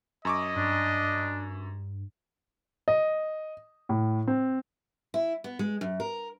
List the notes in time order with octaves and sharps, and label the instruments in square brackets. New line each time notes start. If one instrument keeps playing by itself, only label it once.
[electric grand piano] F#2 C#6 D6 [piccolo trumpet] D#5
[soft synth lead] G2 [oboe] D4
[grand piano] D#5
A2
C4
[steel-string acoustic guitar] E4
B3
G#3
F#2
A#4